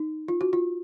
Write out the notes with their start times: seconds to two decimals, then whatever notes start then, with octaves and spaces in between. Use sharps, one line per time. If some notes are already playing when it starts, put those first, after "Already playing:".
Already playing: D#4
0.28 F4
0.41 F#4
0.53 F4